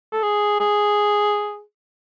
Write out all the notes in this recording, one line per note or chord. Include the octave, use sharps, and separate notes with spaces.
A4
G#4
G#4